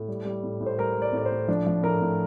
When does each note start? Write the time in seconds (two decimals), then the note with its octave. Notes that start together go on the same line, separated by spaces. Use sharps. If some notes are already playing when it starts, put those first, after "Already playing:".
Already playing: A2
0.08 G3
0.25 G3
0.43 A2
0.60 A2
0.66 C5
0.78 G3 A#4
0.96 G3
1.02 D5
1.13 A2 D5
1.26 C5
1.31 A2
1.48 F3 D4
1.66 F3
1.83 A2 A#4
2.01 A2